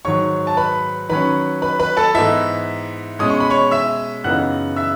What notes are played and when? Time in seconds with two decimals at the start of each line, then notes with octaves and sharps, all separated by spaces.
0.05 G#2 D#3 F#3 C#5 C#6
0.47 A5
0.57 B4 B5
1.10 D#3 F#3 C#4 B4 B5
1.62 B4 B5
1.79 B4 B5
1.97 A4 A5
2.14 G#2 E3 B3 D#4 E4 E5
3.19 B2 G#3 C#4 D#6
3.30 C#6
3.40 B5
3.50 C#5 C#6
3.71 E5 E6
4.24 F#2 C#3 E3 B3 D#4 F#5 F#6
4.76 E5 E6